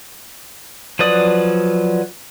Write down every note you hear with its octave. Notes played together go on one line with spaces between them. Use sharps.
F3 F#3 B4 D5 D#6